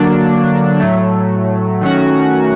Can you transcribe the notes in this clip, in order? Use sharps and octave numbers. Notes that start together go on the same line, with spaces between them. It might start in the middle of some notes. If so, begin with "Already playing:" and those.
Already playing: D3 F#3 A#3 D4
A2 F#3 A3
D#3 F#3 A3 C#4 F#4